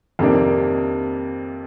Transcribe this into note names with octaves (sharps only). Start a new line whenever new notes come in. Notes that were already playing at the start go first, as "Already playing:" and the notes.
F2 C3 D#3 A#3 D4